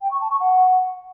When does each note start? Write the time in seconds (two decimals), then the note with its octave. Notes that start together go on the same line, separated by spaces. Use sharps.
0.01 G5
0.11 C#6
0.21 A5
0.30 C#6
0.40 F#5